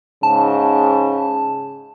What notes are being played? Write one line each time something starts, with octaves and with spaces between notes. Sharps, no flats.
G#2 C#3 A5